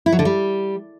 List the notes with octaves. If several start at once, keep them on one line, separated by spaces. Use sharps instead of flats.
E4
F#3
D3
G3